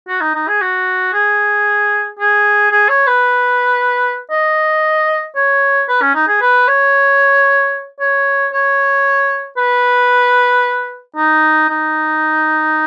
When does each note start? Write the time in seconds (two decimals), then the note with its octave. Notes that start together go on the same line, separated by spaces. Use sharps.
0.09 F#4
0.21 D#4
0.35 D#4
0.48 G#4
0.61 F#4
1.13 G#4
2.19 G#4
2.71 G#4
2.89 C#5
3.07 B4
4.31 D#5
5.36 C#5
5.89 B4
6.02 C#4
6.15 D#4
6.28 G#4
6.41 B4
6.68 C#5
8.00 C#5
8.53 C#5
9.57 B4
11.17 D#4
11.69 D#4